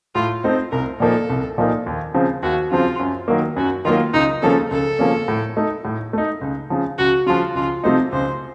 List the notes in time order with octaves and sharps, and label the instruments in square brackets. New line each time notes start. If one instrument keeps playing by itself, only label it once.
[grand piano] A2 [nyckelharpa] F4
[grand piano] A3 C4 D#4 [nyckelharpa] C5
[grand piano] C2 [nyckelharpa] A#4
[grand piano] A#2 F3 A#3 D#4 [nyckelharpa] A4
[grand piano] C2
A#2 F3 A#3 D#4
D#2
C#3 F3 C4
[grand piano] D#2 [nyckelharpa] F#4
[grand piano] C#3 F3 C4 [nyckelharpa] F4
[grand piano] F#2
D#3 F#3 A#3
[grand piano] F#2 [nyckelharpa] F#4
[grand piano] D#3 F#3 A#3 [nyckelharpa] F4
[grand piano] C#2 [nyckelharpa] D#4
[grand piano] C#3 F3 A#3 C#4 [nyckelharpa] A4
[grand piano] C#2 [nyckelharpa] A4
[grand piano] C#3 F3 A#3 C#4
A2
A3 D#4
A2
A3 D#4
C#2
C#3 F3
[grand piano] C#2 [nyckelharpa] F#4
[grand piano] C#3 F3 [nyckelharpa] F4
[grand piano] C#2 [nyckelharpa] F4
[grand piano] C3 F3 A3 D#4 [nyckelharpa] C5
[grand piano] C#2 [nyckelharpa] C5